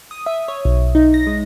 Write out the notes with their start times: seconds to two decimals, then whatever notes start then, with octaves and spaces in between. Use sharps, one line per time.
0.11 D#6
0.26 E5
0.48 C#5
0.65 B1
0.95 D#4
1.14 A#6
1.27 G#3